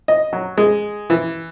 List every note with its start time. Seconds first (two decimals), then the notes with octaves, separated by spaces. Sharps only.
0.08 D#5
0.33 F#3
0.58 G#3
1.10 E3